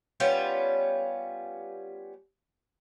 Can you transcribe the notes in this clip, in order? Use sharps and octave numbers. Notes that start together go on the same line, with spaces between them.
G3 B3 C#4 F4